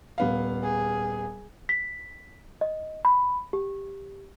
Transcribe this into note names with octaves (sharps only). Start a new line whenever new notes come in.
D#1 B3 F5
G#4
B6
D#5
B5
G4